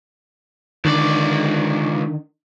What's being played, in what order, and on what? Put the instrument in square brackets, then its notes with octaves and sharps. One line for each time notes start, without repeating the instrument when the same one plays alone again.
[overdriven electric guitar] C#2 D5 [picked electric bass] D3 D#3